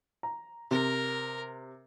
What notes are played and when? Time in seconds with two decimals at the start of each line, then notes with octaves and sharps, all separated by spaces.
0.23 A#5
0.71 C3 A#4